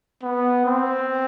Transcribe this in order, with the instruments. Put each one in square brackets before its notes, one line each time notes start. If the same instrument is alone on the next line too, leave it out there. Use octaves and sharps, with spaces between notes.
[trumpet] B3
C4